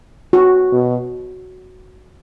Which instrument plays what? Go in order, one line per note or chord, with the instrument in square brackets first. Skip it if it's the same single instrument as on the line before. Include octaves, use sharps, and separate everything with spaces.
[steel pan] F#4
[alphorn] B2